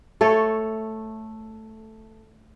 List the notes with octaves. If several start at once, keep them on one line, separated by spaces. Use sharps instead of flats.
A3 A4 C#5